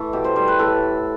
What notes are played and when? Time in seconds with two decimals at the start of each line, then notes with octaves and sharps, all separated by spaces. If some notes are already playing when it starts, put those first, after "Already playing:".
Already playing: E3 A3
0.13 B2 G4
0.24 C5
0.36 G3 C5
0.48 B4
0.59 A2 A4